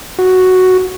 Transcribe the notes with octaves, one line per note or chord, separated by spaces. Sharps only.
F#4